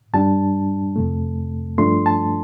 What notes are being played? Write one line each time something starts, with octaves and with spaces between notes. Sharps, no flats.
G2 G3 D4 A5
F2 C3 A3
G2 F3 A3 D4 C6
A5